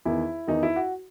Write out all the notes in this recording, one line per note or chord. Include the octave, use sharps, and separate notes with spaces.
E2 D#3 E4
E2 D#3 D#4
E4
F#4